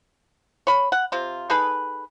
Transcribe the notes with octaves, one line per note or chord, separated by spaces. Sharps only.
C#5 B5
F#5
C3 F4
D#4 G#4 A4 B4